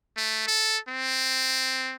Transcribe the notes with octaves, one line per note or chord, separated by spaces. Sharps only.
A3
A4
C4